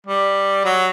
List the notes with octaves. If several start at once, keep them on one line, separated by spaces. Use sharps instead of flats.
G3
F#3